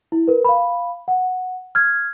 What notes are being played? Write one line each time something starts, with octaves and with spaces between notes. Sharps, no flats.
E4
A#4 B4
F5 B5
F#5
F6 G#6